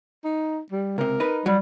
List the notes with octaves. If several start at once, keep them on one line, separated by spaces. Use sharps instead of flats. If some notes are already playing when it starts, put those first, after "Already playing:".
D#4
G3
C#2 C3 A#4
D#4 B4
F#3 G3